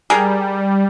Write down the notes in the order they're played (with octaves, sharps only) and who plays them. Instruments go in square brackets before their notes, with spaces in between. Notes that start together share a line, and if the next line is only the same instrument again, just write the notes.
[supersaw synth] G3 [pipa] G#4 A#4